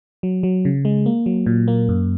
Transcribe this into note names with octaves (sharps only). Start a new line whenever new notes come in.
F#3
F#3
C#3
G#3
A#3
F#3
A#2
A#3
F#2